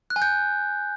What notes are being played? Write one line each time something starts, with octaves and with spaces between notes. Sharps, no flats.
F#6
G#5
G6